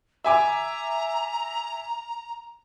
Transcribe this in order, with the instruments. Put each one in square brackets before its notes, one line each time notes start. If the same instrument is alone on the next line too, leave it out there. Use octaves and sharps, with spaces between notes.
[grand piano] E5 G#5 D6 [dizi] A#5